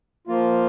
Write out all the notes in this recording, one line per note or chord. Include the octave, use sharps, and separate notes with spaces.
F3 A#3 F4